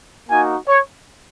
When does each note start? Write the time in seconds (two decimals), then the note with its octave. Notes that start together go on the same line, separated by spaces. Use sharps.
0.29 A#3 D#4 F#4 G#5
0.67 C#5